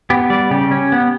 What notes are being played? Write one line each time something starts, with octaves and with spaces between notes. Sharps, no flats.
B3 G4
G3 D5
C#3 G4
C#4
B3